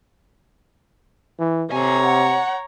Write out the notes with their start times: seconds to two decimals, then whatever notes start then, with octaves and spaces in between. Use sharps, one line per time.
1.39 E3
1.72 C3 A4 C#5 G#5 A#5
2.04 F#5